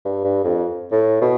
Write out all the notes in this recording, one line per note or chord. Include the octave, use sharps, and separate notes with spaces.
G2
G2
F2
A2
B2